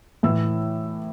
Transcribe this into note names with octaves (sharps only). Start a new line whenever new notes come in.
A2 E3 E6